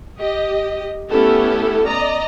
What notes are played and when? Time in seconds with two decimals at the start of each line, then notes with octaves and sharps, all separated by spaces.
0.19 G4 D#5
1.11 A3 B3 C#4 E4 G4 A4
1.86 D5 D#5 A#5